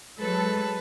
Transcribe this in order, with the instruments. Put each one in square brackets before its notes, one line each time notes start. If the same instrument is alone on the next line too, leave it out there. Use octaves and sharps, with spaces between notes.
[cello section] F#3 G#3 A4 [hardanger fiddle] B4